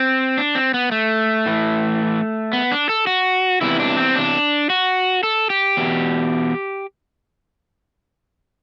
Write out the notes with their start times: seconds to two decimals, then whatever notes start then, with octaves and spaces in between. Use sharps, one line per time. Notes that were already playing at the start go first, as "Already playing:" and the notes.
Already playing: C4
0.38 D4
0.55 C4
0.74 B3
0.92 A3
1.46 A2 E3
2.53 B3
2.72 D4
2.89 A4
3.07 F#4
3.61 E2 C3 E3 E4
3.80 D4
3.97 C4
4.15 D4
4.70 F#4
5.23 A4
5.50 G4
5.77 E2 B2